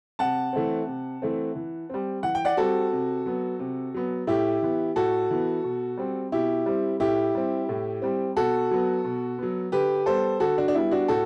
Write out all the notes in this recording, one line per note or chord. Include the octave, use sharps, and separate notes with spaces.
C3 F#5 A5
E3 A3 C4
C3
E3 A3 C4
E3
G3 C4
E3 F#5
G5
D5 F#5
G3 C4 F#4 A4
C3
F#3 B3
C3
F#3 B3
A2 E4 G4
E3 B3
A2 F#4 A4
E3 B3
B2
G3 C4
B2 E4 G4
G3 C4
A2 E4 G4
G3 C4
A2
G3 C4
B2 F#4 A4
F#3 B3
B2
F#3 B3
D3 G4 B4
G3 B3 A4 C5
D3 F#4 A4
D4 F#4
D4
G3 B3 E4
D4 F#4
A2 F#4 A4